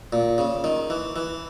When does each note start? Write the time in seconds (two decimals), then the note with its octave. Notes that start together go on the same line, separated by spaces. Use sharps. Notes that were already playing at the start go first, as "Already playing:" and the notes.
0.13 A#2
0.38 C#3
0.64 D#3
0.90 E3
1.16 E3